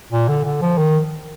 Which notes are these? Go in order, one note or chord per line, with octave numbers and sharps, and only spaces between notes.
A#2
D3
D3
F3
D#3